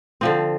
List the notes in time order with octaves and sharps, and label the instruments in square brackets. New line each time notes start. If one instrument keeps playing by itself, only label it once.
[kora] D3 F3 C4